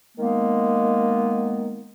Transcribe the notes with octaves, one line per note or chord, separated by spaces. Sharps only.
D#3 G#3 A#3 B3